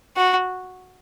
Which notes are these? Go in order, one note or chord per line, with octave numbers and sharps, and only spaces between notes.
F#4